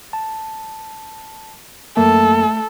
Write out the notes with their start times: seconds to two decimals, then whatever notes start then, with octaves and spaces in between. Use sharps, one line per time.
0.13 A5
1.97 F#2 A3 A#3 A4